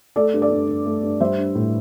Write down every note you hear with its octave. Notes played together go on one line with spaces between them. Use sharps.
A3 A4 D5
G2
A4 D5
G2
G2
A3
G2
G3 C5 E5
D4
A2